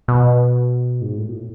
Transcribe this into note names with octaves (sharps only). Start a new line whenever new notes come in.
B2
G#2
A2
B2
A2